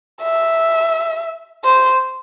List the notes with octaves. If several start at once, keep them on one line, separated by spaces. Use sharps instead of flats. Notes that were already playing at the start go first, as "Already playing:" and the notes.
E5
C5